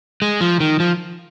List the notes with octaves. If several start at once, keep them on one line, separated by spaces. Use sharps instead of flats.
G#3
F3
D#3
F3